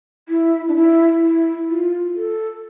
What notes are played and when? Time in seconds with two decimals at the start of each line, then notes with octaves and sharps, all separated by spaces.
0.29 E4
0.68 D4
0.75 E4
1.22 E4
1.69 F4
2.15 A4